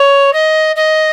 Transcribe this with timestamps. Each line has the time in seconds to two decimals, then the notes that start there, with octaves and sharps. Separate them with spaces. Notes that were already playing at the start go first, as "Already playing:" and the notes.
Already playing: C#5
0.33 D#5
0.76 D#5